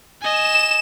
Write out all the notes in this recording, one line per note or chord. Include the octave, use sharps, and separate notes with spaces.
D#5 G#5 E7